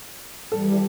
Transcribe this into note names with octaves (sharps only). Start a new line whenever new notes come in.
E3 G3 A4